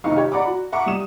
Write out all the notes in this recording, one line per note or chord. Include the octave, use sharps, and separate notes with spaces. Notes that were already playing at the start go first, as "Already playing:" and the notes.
F1 D#3 D#4 F5 C#6
G4 C#5
D5 F#5 A#5 B5 D6
F#4
E5 F#5 A#5 C#6 D6
G3 D#6 E7